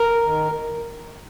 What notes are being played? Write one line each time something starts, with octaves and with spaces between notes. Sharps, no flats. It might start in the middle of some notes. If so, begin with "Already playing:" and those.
Already playing: A#4
D#3